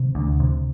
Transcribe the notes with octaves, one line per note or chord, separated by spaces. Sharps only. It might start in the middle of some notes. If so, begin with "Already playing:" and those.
Already playing: C3
D2
C3